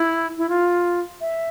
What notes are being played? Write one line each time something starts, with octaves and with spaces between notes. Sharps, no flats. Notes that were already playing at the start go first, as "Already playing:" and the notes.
Already playing: E4
E4
F4
E5